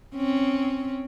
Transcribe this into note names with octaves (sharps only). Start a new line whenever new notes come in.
C4 C#4